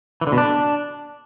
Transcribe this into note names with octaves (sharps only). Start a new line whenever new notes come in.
E3
D3
B2
D4